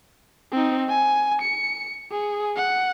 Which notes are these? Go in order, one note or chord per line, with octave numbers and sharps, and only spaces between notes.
C4 D#4
G#5
C#7
G#4
F#5